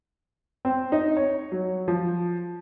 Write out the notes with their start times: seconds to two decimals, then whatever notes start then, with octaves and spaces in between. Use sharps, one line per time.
0.65 C4
0.92 D#4
1.17 C#5
1.52 F#3
1.88 F3